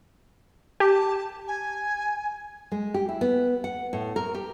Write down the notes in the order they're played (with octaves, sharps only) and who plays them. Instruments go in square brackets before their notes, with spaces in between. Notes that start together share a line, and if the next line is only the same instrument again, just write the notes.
[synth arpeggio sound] G4 [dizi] A5
[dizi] G#5
[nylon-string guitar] G#3
G4
E4
B3
F#5
A2
A#4
G4